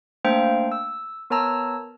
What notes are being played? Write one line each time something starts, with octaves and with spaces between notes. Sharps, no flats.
A3 A#3 D4 C5 F5 G5
E6
B3 A#4 C#5 A5 A#5 E6